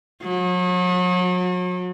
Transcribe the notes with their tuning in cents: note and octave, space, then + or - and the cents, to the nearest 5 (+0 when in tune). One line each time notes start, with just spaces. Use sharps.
F#3 -40